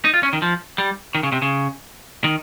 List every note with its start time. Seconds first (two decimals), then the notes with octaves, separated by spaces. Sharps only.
0.05 D#4
0.14 F4
0.23 C#4
0.33 D#3
0.42 F3
0.78 G3
1.15 D#3
1.23 C#3
1.32 C3
1.42 C#3
2.24 D#3